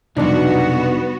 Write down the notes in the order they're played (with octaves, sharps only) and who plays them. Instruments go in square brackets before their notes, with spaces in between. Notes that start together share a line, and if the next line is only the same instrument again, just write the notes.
[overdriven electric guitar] B1 [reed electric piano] F2 D4 D#4 [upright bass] C3 G3 [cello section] B3 F#4